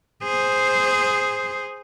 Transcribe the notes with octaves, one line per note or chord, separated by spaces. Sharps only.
G#4 C5